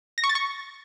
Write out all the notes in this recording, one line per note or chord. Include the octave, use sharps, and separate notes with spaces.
A#6
C#6
A6
C#6